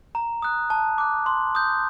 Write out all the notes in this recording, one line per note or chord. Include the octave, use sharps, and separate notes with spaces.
A#5
D#6 F#6
A5
D6 F#6
C6
D#6 G6